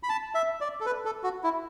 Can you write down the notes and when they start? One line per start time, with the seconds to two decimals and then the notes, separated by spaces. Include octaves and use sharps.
0.03 B5
0.09 A5
0.35 E5
0.61 D5
0.80 A4
0.86 B4
1.05 A4
1.23 F#4
1.44 E4